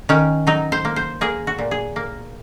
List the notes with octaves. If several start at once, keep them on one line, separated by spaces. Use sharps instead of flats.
D#3 C#4
F#3 D#4
C5
A#3
C5
A#3 G#4
F#4
A#2
G#4
A#3